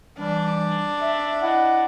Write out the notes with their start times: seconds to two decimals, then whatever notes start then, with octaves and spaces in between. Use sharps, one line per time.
0.19 E3 G3 D4
1.01 E5
1.42 E4 D#5 F#5